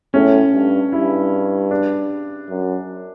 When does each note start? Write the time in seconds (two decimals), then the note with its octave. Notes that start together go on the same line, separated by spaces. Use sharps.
0.14 A2 C#4
0.53 G2
0.92 G2 E4
1.71 D4
2.50 F#2